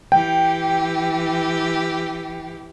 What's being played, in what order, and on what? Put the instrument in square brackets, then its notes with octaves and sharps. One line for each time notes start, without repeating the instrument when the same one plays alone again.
[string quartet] E3 G4 [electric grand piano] G5